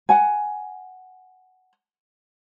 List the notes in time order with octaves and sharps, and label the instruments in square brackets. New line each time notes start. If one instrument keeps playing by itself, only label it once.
[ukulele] F#5 G#5